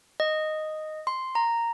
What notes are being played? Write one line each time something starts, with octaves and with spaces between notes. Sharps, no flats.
D#5
C6
A#5